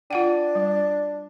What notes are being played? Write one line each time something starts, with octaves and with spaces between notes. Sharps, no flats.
D4 F4 F#5 G5
G3